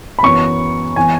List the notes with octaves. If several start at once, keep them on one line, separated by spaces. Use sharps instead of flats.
B5
F#2 E3 B3 C#6
E3 B3 G#5